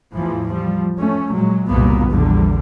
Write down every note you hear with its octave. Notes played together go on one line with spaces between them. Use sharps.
E2 A2 E3 F3
F3 G3
A3 C#4
A#2 F#3 G#3
F#1 C2 F#2 A#2 A#3 B3
A#1 E2 D3 G3